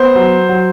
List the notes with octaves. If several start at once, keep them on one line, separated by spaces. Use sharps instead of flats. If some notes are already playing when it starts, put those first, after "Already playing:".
Already playing: B3 C5
F#3
F#3